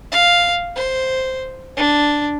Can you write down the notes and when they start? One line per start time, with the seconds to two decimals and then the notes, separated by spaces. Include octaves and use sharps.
0.12 F5
0.76 C5
1.77 D4